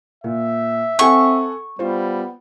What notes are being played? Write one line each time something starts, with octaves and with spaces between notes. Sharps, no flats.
A#2 E5
C4 A4 F#5 G#5 C#6
G3 B3 F4 C5